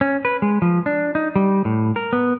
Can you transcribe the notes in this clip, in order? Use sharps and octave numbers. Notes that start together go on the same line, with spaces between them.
C#4
B4
G#3
F3
D4
D#4
G3
A2
A#4
B3